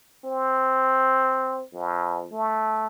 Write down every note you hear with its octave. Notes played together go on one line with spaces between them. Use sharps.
C4
F2
A3